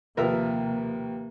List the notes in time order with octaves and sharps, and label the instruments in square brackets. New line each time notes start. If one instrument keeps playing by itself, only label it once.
[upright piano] D#2 F3 B4 [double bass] C3 A#3 [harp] A#4 E5